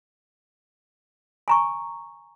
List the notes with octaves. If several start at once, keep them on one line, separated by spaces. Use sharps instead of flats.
G#5 A#5 C#6